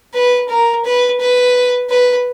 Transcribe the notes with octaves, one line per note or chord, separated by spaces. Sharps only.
B4
A#4
B4
B4
B4